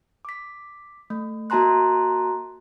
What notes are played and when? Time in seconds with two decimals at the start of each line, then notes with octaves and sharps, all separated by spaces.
0.25 D6 B6
1.10 A3
1.50 A#3 F#4 A5 A#5 C6 F#6